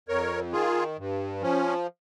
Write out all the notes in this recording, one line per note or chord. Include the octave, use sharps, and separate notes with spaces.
F2 A#4 C#5
D#3 F4 G#4
G2
F3 C#4